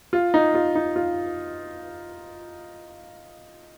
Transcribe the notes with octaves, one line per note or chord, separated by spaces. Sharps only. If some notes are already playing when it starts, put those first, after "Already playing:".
F4
D#4
F4
D#4
F4